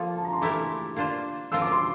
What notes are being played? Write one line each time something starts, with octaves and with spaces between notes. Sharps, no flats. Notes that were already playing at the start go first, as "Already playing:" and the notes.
Already playing: F3 A#3 F4 A4 C6
A5
A#5
C6
E3 A3 E4 G4 A#4 D6
A#3 D4 F4 C5
F3 C4 F4 A#4 F5 E6
D6
C6